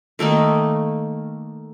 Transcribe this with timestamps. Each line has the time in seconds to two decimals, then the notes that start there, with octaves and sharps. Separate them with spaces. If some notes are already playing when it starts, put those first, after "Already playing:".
0.19 D#3 A3 A#3 D#4